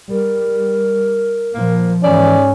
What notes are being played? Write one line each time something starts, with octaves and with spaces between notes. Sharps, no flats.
G3 A#4
A#2 F3 A#3
G#2 E3 C#4 D5